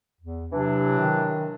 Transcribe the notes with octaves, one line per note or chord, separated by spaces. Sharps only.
E2
C3 E3 F#3 D4
D#3